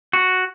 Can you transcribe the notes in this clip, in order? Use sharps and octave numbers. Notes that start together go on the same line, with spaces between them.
F#4